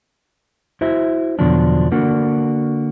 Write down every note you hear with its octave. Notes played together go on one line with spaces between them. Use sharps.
E4 F#4 C5 E5
E2 B2 D3 F3 F#3 D4
D3 A#3 D4 F#4